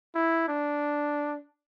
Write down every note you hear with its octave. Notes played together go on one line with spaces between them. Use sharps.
E4
D4